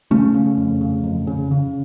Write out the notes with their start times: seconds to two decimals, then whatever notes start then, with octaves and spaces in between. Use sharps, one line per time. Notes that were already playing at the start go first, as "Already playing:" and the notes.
0.11 C#3 A3 C#4
0.34 C#3
0.58 F2
0.81 C#3
1.04 F2
1.27 C#3
1.51 C#3